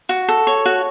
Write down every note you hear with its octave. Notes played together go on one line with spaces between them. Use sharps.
F#4
A4
C#5
F#4